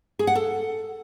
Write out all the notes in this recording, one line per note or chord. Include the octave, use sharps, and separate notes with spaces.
G#4
F#5
A4